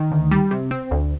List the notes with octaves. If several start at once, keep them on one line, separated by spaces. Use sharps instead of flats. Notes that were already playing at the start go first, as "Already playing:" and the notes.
Already playing: D#3
D2
G3
C3
C4
D2